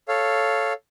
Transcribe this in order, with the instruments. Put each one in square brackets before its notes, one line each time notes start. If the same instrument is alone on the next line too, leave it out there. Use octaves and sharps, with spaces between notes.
[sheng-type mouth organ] A4 C#5 F5